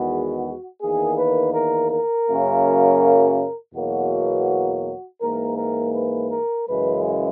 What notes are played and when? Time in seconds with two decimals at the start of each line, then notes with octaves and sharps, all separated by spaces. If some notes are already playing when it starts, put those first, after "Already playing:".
Already playing: E2 D#3 G#3 B3 F#4
0.81 E2 D#3 A#3 G#4
1.18 B4
1.54 A#4
1.91 A#4
2.28 F#2 C#3 F#3 A#3
3.74 E2 B2 F#3 A#3 F#4
5.21 G#2 E3 A#3 A#4
5.57 A#4
5.94 B4
6.31 A#4
6.67 F#2 C#3 E3 G#3 B4